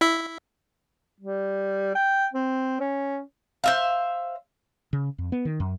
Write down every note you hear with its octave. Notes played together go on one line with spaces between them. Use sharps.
E4 E5
G3
G5
C4
C#4
C5 E5 F5
C#3
F2
B3
D#3
F#2